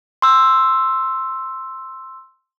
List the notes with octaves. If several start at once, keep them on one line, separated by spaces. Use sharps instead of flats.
C6 E6